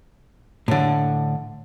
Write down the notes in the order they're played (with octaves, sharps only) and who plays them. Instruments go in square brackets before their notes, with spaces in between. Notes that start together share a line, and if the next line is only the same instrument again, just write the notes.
[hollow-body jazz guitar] A2 D3